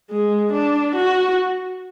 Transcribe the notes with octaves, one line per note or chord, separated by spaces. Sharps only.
G#3
D4
F#4